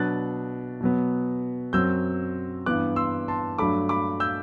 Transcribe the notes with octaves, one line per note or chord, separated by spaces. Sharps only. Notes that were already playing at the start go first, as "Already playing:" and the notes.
Already playing: B2 F#3 B3 D4 F#6 A6
B2 F#3 B3
F#2 F#3 C4 E6 G6
G2 E3 B3 D6 F#6
C6 E6
A5 C6
G2 F#3 A3 D4 B5 D6
B5 D6
E6 G6